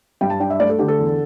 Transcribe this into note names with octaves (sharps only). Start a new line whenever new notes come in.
G2 G5
A5
D4 G5
E5
A3 D5
A4
D3 G4
A4
E2